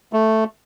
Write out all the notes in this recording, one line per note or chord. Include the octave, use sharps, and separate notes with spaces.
A3